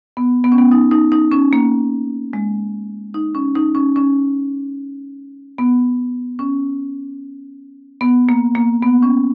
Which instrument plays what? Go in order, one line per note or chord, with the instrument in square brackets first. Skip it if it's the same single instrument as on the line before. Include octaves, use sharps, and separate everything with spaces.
[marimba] B3
B3
C#4
B3
D#4
D#4
D#4
C#4
A#3
G#3
D#4
C#4
D#4
C#4
C#4
B3
C#4
B3
A#3
A#3
B3
C#4